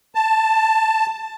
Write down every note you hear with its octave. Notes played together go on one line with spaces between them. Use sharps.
A5